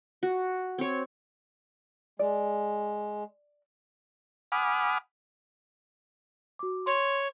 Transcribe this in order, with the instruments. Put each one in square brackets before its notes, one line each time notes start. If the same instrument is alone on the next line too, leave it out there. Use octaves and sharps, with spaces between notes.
[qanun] F#4
C4 C#5
[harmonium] G#3 [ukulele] D5
[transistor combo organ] F#5 G#5 B5 D6 D#6 F6
[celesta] F#4 D6
[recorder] C#5 [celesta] C6